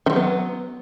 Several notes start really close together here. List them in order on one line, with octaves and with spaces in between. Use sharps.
D#3 F3 F#3 B3